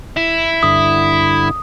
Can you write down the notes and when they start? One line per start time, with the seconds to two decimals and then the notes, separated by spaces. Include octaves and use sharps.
0.17 E4
0.63 G2 D3 D#6